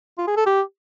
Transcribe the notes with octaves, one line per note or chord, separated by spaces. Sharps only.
F4
G#4
A4
G4